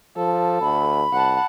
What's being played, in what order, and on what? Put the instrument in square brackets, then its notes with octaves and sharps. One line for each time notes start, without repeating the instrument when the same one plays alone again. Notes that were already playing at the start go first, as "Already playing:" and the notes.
[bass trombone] F3 [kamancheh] A4
[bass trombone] D2 [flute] B5
[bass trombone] C2 [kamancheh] F#5 A5